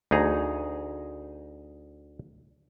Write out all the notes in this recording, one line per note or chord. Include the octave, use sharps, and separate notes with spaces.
D2 D#4 G#4 A#5